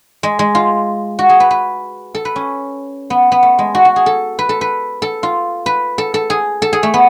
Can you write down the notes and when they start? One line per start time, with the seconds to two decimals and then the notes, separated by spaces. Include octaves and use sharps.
0.23 G#3
0.39 G#3
0.55 F4
1.19 F#4
1.29 G#4
1.40 B4
1.51 B4
2.15 A4
2.25 B4
2.36 C#4
3.10 B3
3.32 B3
3.43 A3
3.59 G#3
3.75 F#4
3.85 F#4
3.96 G#4
4.06 A4
4.39 B4
4.49 A4
4.61 B4
5.02 A4
5.23 F4
5.66 B4
5.98 A4
6.14 A4
6.30 G#4
6.62 A4
6.73 G#4
6.83 A3
6.94 B3